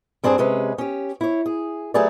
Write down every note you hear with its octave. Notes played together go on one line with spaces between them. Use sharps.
G2 C4 D4 G#4
C3 G#3 C#4 B4
C#4 G4
E4 C#5
G#4
F#3 A3 G4 G#4 B4 D5